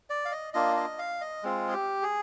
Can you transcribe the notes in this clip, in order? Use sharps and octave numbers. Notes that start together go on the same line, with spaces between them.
D5
F5
D#5
A#3 D4 F4 D#5
D#5
F5
D#5
G#3 C4 F4
G#4
G4
G#4